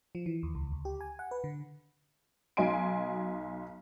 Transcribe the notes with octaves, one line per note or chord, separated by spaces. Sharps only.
F3
E3
D#2
C#2
D2
G4
G#5
F#5
B4
D3
B1 F#3 D#4 G#5 C6 D7